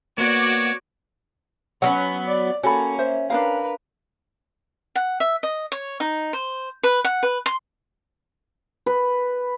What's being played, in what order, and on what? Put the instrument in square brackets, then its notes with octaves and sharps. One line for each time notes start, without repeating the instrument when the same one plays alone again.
[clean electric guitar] A#3 B3 [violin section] F#4 D5 D6 [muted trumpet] C#5
[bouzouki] F#3 A#3 B3 [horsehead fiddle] C#4 [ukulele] F#5
[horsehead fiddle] D5
[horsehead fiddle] A#3 [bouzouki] C#4 [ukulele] F#4 A4 B5
[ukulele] C5 E5
[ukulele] D4 D#4 F5 [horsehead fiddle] A#4 B4
[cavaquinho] F#5
E5
D#5
C#5
D#4
C5
B4
F#5
B4
C6
[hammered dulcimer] B4